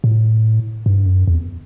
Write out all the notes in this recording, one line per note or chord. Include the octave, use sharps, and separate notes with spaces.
A2
G2
F#2
E2